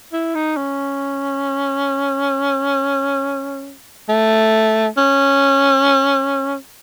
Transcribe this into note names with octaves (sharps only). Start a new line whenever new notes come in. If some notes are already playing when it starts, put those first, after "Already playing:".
E4
D#4
C#4
A3
C#4